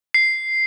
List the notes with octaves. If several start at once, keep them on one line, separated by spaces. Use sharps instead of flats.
C7